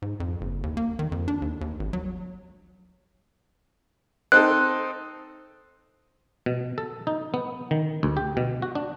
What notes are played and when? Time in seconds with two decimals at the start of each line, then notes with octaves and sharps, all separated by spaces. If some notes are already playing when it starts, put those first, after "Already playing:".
0.02 G#2
0.20 F2
0.41 F#1
0.63 D#2
0.77 A#3
0.99 D#3
1.12 F2
1.28 D4
1.42 D#2
1.61 D#2
1.79 G#1
1.93 F#3
4.32 C4 D#4 A4 F#6
6.46 B2
6.78 A4
7.07 D#4
7.34 B3
7.71 D#3
8.03 D2
8.17 G4
8.37 B2
8.62 F#4
8.75 D4